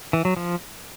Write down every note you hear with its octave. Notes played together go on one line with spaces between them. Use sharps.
E3
F#3
F3